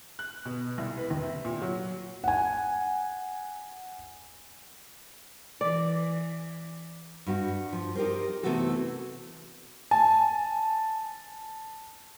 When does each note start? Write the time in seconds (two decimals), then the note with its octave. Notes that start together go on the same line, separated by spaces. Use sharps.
0.19 F#6
0.45 B2
0.78 C2
0.97 B4
1.10 D#2
1.22 C3
1.45 A#2
1.62 F#3
2.24 F#5 G#5
5.61 E3 D5
7.26 G2 F#4
7.73 F3
7.95 D#4 G4 A#4 C5
8.43 C3 E3 A3 B3 F#4 A4
9.91 G#5 A5